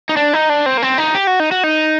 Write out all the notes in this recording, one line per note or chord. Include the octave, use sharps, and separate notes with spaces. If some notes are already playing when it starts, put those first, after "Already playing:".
D#4
D4
D#4
D4
C4
A#3
C4
D#4
G4
F#4
D#4
F#4
D#4